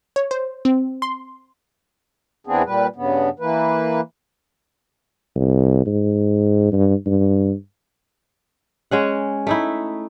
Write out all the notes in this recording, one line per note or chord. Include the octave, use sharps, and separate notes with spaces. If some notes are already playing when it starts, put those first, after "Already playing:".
C#5
C5
C4
C6
E2 E3 B3 C4 D4 G#4
A#2 G3 B4
G2 C#3 B3
E3 A#3 B4
C2
G#2
G2
G2
G#3 C#4 F#5
A3 D#4 E4